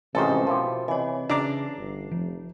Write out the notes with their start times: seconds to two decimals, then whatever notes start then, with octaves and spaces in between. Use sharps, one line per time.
0.15 A1 G#2 C3 D#3 C#4 F4 A4 C5
0.47 B2 F3 E4 G4 A#4
0.88 C3 E3 C#5 D#5
1.29 C#3 D4 A#5 D6 C7
1.77 G1
2.12 F1 F3